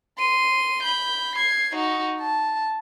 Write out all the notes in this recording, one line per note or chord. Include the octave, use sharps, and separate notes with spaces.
C6 D#7
B5 G6
G#6 C7
D#4 F#4
A5